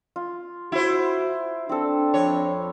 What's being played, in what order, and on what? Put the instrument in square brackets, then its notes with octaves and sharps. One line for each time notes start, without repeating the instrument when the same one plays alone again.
[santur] F4
[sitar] E4 C5 [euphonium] F#4
[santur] C4 A4 [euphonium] D4
[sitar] F2 C#5